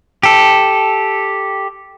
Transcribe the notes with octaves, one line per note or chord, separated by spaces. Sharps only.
G4 A4